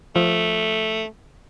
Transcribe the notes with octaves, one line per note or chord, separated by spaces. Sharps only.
F3 A3